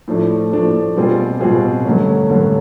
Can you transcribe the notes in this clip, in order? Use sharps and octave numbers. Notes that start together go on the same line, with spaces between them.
A2 F3 A3 D4
A2 F3 A3 D4
B2 G3 C4 F4 G#4
B2 G3 C4 F4 G#4
G2 D3 F#3 A3 C#4
G2 D3 F#3 A3 C#4